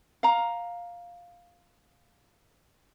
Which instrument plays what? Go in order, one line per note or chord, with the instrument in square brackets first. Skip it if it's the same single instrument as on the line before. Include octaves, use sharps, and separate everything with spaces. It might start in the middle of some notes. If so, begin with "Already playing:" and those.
[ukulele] F5 A#5